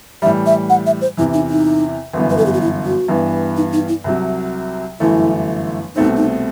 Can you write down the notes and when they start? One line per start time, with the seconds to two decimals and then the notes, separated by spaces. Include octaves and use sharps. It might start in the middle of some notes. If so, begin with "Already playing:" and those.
0.22 A2 E3 G3 E5
0.46 E5
0.70 F#5
0.86 E5
1.01 C5
1.17 E2 C3 E3 E4
1.33 D#4
1.50 D#4
2.13 G1 F#2 E3 B3
2.30 B4
2.37 A4
2.46 G4
2.53 F#4
2.61 E4
2.85 F#4
3.08 G2 E3 B3
3.56 D#4
3.73 D#4
3.88 E4
4.04 C2 C3 F#3
5.00 G1 F#2 E3 A3 E4
5.96 C2 B2 A3 C4 D#4
6.16 D#4